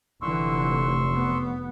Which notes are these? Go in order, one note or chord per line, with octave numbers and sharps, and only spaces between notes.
F1 D3 E3 C6 C#6 E6
B3